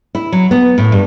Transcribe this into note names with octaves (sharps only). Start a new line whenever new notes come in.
E4
F#3
B3
A2
G2